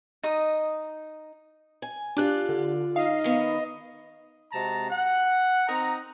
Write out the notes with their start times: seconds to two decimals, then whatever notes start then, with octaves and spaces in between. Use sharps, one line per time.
0.23 D#4 D#5
1.82 G#5
2.17 D4 F4 G4 D5 F#6
2.49 D3
2.96 D#4 D#5 F5 C7
3.24 D#3 B3
4.53 C3 G#3 C4 F#4 A5 A#5
4.90 F#5
5.67 C4 D#4 F#5 A#5